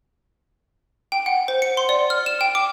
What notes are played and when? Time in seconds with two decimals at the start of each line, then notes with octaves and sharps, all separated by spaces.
1.12 G5
1.26 F#5
1.48 C5
1.62 C#7
1.77 C6
1.89 D5
2.10 F6
2.26 E7
2.41 G5
2.55 D6